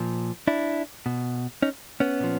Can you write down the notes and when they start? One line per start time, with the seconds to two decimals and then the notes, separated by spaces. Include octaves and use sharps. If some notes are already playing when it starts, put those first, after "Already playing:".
Already playing: A#2 F3
0.48 D4 E4
1.06 B2
1.63 C#4 D#4
2.00 B3 C#4
2.20 A#2 F3